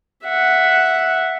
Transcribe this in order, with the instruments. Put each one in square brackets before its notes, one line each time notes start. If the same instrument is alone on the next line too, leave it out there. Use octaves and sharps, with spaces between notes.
[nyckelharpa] E5 F#5